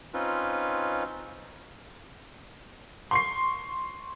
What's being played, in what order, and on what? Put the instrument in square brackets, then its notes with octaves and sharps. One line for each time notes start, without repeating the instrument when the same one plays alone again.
[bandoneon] C4 C#4 D#4 F4 B4
[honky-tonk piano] C6 C#6 C7